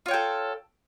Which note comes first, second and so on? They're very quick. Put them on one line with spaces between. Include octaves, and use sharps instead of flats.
F4 C#5 G5 A4